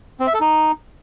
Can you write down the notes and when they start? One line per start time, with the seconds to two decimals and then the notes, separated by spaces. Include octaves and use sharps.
0.20 C4
0.27 E5
0.34 A4
0.41 D#4